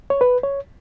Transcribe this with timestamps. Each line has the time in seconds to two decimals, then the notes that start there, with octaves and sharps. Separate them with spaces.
0.10 C#5
0.21 B4
0.43 C#5